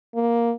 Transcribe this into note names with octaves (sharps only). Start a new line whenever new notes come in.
A#3